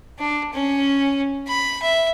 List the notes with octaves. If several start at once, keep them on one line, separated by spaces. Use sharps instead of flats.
D4
C#4
B5
E5